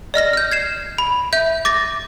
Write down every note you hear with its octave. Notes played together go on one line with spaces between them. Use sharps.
D5 D#5 F6 A#6
F6 G6
G#6 C7 E7
B5
E5 G6
D6 A6 A#6